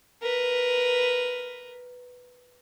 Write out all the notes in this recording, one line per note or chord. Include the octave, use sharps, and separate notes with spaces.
A#4 B4